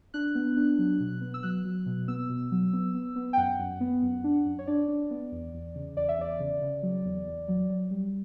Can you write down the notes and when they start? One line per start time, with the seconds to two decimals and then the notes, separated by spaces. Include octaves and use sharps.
0.14 D4 F#6
0.35 B3
0.57 D4
0.78 F#3
1.00 B2
1.21 B3
1.34 E6
1.43 F#3 F#6
1.65 F#3
1.86 B2
2.08 B3 E6
2.29 B2
2.51 F#3
2.73 B3
2.94 B3
3.16 B3
3.33 G5
3.37 F#2 F#5
3.59 F#2
3.80 B3
4.03 F#2
4.24 D4
4.46 F#2
4.59 C#5
4.67 D4 D5
4.88 D4
5.11 B3
5.32 E2
5.54 E2
5.75 C#3
5.97 E2 D5
6.09 E5
6.19 E2 D5
6.40 C#3
6.61 C#3
6.83 F#3
7.05 E2
7.26 E2
7.48 F#3
7.70 F#3
7.91 G3